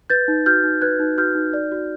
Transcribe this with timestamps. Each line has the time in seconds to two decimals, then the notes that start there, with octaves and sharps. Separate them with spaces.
0.10 B4 G6 A6
0.28 D#4
0.46 F#4 F6 G6
0.64 D#4
0.82 B4 F#6 G#6
0.99 D#4
1.18 F#4 F6 G6
1.35 D#4
1.54 D5
1.72 F#4